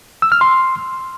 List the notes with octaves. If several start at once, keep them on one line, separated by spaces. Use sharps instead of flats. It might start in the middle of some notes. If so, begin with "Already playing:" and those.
E6
F6
C6